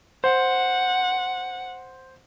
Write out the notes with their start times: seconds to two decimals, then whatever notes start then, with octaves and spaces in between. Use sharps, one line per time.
0.24 C5 F#5